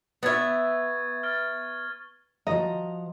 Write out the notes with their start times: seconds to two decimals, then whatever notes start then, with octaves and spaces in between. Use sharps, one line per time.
0.23 B3 E5 C#6 G#6 A6
1.23 F6 A6
2.47 F3 F#4 D#5 A#5